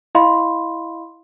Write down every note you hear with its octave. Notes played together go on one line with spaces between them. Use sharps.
E4 D#5 F5 B5 C6